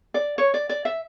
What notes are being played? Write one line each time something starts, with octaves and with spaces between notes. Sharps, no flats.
D5
C#5
D5
D5
E5